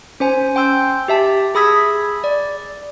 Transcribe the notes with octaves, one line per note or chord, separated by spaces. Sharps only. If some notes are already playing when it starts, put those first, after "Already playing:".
C#4 C5 G#5
G5 C6 E6 G6
G4 E5 A5
G#4 B5 D#6 E6 G#6 B6
D5